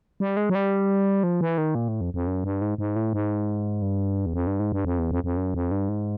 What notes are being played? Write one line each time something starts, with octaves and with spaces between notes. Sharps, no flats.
G3
G#3
F#3
G3
F3
E3
D#3
A#2
A2
F2
F2
F#2
G2
G#2
G#2
A2
G#2
G2
E2
F2
G2
G#2
G2
F2
E2
F2
F2
F#2
F2
G2
G#2